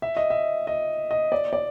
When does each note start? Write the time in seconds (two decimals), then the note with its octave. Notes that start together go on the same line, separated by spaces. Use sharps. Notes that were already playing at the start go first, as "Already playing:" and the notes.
0.02 E5
0.17 D#5
0.30 E5
0.67 D#5
1.11 D#5
1.32 D5
1.53 D5